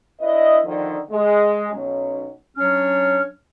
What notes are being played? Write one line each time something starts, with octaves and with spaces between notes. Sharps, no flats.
D4 E4 B4 D#5
D3 D#3 F3
G#3
B1 F#3 C#4
F#3 C#4 D4 C#5 F6